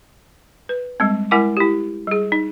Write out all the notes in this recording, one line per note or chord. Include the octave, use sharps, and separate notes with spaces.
B4
G3 G#3 C4
G#3 E4 A#4 F#5 G#5 D6
E4 G4
G3 G#4
D#4